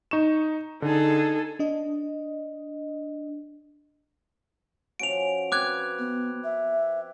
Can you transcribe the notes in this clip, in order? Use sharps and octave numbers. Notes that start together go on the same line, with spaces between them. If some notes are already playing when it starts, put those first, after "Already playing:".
D#4 C#6 E7
D3 D#4 G#4 A4
D4 D#5
F3 C#4 F#4 D7 F7
C4 B4 B5 D6 F#6 G#6
B3
E5